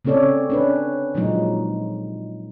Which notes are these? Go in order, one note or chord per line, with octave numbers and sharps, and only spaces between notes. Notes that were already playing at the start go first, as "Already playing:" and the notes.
C#3 C4 C#4 A4 C#5 D5
C#4 D4 B4
A#2 F3 F#3 G#3 D#4